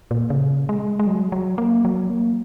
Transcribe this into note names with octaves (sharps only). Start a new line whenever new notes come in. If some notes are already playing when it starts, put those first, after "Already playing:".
A#2
C#3
G#3
G#3
F#3
F#3
A#3
F#3
A#3